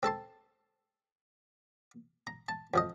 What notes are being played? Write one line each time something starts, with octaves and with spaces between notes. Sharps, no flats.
C4 A4 A5 C6
A#5
A5
F2 F3 D#5